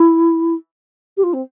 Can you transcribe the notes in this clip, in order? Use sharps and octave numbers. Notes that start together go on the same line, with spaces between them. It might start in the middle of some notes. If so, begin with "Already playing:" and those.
Already playing: E4
G4
F4
C4